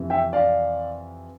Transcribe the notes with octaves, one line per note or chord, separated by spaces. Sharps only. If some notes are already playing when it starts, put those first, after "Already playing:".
Already playing: F2 C3 E3
E5 G5
D5 F5